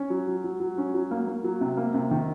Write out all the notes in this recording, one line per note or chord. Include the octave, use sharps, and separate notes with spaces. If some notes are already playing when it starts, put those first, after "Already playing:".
Already playing: C#4
F#3
F#3
F#3
F#3
C#4
F#3
A#3
A#3
F#3
C3
A#3
C3
D#3